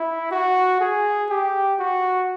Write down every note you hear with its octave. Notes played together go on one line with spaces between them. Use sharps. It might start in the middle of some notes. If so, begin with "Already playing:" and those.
Already playing: E4
F#4
G#4
G4
F#4